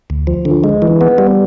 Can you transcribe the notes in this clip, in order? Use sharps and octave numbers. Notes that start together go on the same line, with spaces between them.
D2
F3
D3
G#3
E3
B3
G3